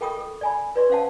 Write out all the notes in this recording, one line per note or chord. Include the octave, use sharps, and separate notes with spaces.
A4 A#4 G5 B5 C#6 D#6
A4
D5 G#5 B5
B4 D5 C6 C#6
C#4 C5 F5 F#5 A5